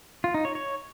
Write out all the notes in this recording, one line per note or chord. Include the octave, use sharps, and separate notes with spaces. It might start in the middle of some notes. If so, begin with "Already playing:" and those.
F4
D#4
C#5
C#5